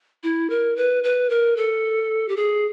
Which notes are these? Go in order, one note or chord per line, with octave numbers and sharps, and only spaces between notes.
E4
A#4
B4
B4
A#4
A4
G4
G#4